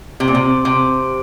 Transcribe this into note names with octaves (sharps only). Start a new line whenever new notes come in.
C3
A#2
C3
C3